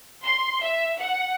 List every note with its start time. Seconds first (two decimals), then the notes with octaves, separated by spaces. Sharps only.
0.24 C6
0.61 E5
0.98 F#5